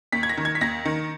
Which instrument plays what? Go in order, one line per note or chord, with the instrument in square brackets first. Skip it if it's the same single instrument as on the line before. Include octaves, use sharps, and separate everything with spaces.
[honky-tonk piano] D#2 B6
G#6
A#6
D#3
G#6
B6
D#2 A#6
D#3